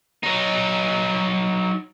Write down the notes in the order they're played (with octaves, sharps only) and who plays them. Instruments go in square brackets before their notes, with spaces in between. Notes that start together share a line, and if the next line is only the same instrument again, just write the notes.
[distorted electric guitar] F#3 D#4